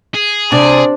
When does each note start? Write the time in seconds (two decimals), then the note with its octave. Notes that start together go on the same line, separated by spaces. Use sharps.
0.15 G#4
0.52 C3 D4 D5